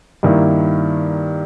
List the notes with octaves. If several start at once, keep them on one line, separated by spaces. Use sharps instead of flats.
G2 D#3 A#3 E4